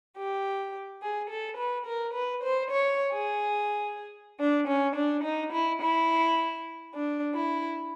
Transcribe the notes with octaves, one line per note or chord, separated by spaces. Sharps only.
G4
G#4
A4
B4
A#4
B4
C5
C#5
G#4
D4
C#4
D4
D#4
E4
E4
D4
E4